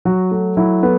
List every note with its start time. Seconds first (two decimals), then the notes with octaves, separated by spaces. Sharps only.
0.05 F#3 F#4
0.31 A3
0.57 F#3 E4
0.82 A3 B3